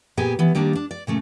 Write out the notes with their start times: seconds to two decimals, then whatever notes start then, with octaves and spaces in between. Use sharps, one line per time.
0.17 A#2 B3 G4 G#4 G#5
0.39 E3 B3
0.55 D#3 G3 A#3 D4
0.75 D4
0.91 D5
1.07 A#2 C#3 A3